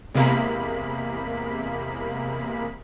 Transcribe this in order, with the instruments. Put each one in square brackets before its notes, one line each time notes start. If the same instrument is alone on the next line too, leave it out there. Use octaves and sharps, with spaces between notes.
[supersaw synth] E2 C3 G#3 A#3 B5 B6